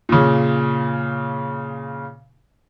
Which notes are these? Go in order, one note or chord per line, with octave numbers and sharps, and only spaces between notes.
A#2 C#3